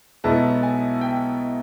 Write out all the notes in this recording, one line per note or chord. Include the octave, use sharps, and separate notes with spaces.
B1 B2 G#3 B3 E4 A5
G#5
G5